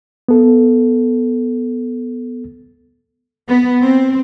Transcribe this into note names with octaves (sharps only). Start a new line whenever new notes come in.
B3 A4
B3
C4